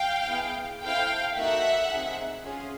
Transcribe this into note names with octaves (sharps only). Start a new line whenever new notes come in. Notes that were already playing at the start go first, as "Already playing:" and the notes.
Already playing: F5 G5
B3 E4 G#4
C4 E4 A4 F5 G5
A#3 D#4 F#4 A4 E5 F#5
C4 D#4 G#4
C#4 F4 G#4